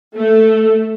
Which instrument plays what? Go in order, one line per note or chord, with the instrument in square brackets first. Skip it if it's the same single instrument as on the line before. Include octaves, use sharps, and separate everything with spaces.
[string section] A3